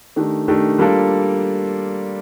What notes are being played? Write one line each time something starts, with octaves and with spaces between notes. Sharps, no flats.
D#3 A3 D4 G4
D#3 A3 D4 G4
G3 A#3 D4 F4 A4